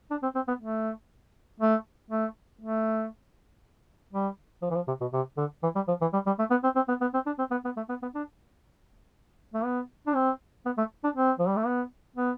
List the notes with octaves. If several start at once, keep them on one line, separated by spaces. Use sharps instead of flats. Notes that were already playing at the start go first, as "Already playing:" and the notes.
D4
C4
C4
B3
A3
A3
A3
A3
G3
F3
E3
F3
C3
B2
C3
D3
E3
G3
F3
E3
G3
G3
A3
B3
C4
C4
B3
B3
C4
D4
C4
B3
B3
A3
B3
B3
D4
A3
B3
D4
C4
B3
A3
D4
C4
F3
G3
A3
B3
B3